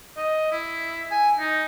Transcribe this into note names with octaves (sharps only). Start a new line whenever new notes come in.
D#5
E4
G#5
D#4